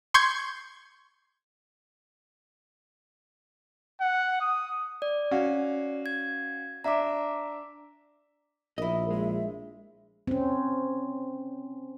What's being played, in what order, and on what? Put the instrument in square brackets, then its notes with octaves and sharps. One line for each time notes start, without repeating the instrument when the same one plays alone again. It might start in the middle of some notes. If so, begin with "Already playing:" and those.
[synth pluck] C6 C#6 G6 G#6
[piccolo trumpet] F#5
D#6
[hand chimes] D5
[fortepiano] C#4 F#4 F5
[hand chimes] G#6
[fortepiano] D4 E5 [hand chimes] A#5 D6
[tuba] A#1 [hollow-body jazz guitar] E4 D#5 [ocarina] A#4
[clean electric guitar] G#3 [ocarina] E5
[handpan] C4 C#4